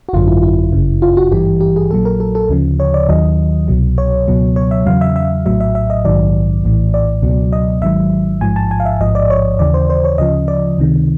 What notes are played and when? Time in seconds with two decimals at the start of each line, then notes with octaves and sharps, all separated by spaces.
0.09 F#4
0.13 G#1 F#2 D3 F#3 F4
0.28 E4
0.43 E4
0.72 G1 F#2 C#3
1.02 F4
1.17 F#4
1.32 G#1 G2 E3 G4
1.61 G4
1.76 G#4
1.91 A#1 A#2 F#3 A4
2.05 A#4
2.20 A4
2.35 A4
2.49 D2 C#3 F3
2.80 C#5
2.94 D5
3.09 D#2 D#3 F#3 D#5
3.68 C2 B2 F#3
3.98 C#5
4.28 C#2 B2 F#3
4.56 C#5
4.71 E5
4.86 E2 C#3 F#3 F5
5.01 E5
5.16 E5
5.46 A#1 A2 F#3 E5
5.60 E5
5.75 E5
5.90 D#5
6.05 A#1 G#2 D#3 F#3 D5
6.64 A#1 A2 E3
6.94 D5
7.22 C#2 B2 F#3
7.53 D#5
7.82 G#1 G#2 D#3 F#3 E5
8.41 A1 G#2 F3 G#5
8.56 A5
8.71 G#5
8.80 F5
8.85 E5
9.00 A1 G#2 F3 D#5
9.15 D5
9.30 C#5
9.59 D#2 C#3 E3 D5
9.74 C5
9.90 C5
10.04 C#5
10.18 D2 C#3 F3 D#5
10.48 D5
10.78 C#2 C3 D#3